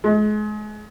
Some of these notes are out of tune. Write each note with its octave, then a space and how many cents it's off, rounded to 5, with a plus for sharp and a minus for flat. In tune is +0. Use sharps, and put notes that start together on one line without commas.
G#3 +35